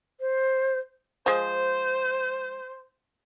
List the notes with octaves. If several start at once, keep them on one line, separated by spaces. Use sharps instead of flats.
C5
F3 G#3 C5